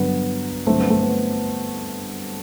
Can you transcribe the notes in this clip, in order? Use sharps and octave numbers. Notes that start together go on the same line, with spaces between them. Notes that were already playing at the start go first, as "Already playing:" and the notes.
Already playing: G2 D3 F#3 B3
G2 D3 F#3 A3 C4
B3
A3
B3